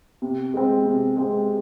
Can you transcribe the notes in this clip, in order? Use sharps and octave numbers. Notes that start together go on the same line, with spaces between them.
C3
G#3 C4
C3
G#3 C4